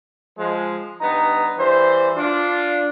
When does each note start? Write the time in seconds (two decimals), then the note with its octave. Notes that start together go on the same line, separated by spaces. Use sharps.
0.38 F3 G#3
1.01 G2 B3 D#4 A#5
1.58 E3 G3 C5
2.17 D4 F4